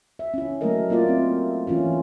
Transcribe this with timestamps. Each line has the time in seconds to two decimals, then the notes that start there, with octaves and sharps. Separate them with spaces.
0.19 E5
0.34 C#4 E4
0.61 F#3 A3 A#3 A4 A#4 D#5
0.90 A#3 E4 F4 D5
1.08 C4
1.67 E3 C#4 E4 F4